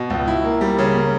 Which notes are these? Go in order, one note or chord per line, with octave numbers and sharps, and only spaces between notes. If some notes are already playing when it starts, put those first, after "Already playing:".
Already playing: B2
C#2
E4
A#3
G3
C#3
A#3